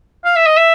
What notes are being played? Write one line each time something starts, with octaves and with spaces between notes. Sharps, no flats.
F5
E5
D#5
E5